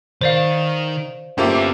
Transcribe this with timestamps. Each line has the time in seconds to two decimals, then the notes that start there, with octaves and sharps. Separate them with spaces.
0.21 D#3 C5 D5 F5
1.38 G1 A#3 C#4 F4 G4 C5 E5 A#5